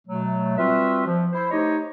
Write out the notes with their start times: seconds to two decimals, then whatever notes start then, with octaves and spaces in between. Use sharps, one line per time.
0.07 B2 F#3 A3
0.58 G3 C4 F4 F#4 B4 E5
1.06 F3
1.33 E4 C5
1.51 A3 D#4 G4 C5 C#5 D#5